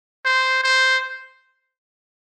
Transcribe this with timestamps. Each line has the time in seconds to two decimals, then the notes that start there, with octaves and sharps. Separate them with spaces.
0.25 C5
0.64 C5